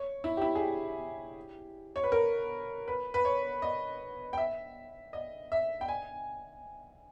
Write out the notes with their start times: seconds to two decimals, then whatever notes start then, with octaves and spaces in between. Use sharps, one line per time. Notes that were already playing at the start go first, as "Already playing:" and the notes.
Already playing: C#5
0.24 E4
0.37 G4
0.42 E4
0.55 G#4
0.60 G4
1.96 C#5
2.04 B4
2.12 A#4
2.88 B4
3.14 B4
3.25 C#5
3.62 D#5
4.33 G5
4.38 E5
5.13 D#5
5.52 E5
5.81 G5
5.88 G#5